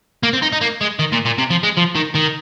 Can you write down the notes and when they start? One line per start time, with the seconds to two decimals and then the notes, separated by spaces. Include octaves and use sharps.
0.23 A#3
0.33 C4
0.42 D#4
0.52 D#4
0.61 A#3
0.81 G#3
0.99 D#3
1.13 A#2
1.26 A#2
1.38 C3
1.51 F3
1.63 G#3
1.77 F3
1.95 D#3
2.15 D#3